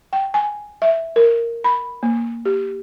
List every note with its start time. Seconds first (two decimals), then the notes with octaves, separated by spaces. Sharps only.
0.13 G5
0.34 G#5
0.82 E5
1.16 A#4
1.64 B5
2.03 A#3
2.45 G4